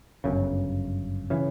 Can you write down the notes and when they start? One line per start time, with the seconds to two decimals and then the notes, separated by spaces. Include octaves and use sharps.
0.24 G1 F#2 C#3
1.30 C#3 E3